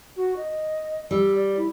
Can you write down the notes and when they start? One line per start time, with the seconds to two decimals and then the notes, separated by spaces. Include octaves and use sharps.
0.16 F#4
0.36 D#5
1.11 G3 E6
1.35 D5
1.57 E4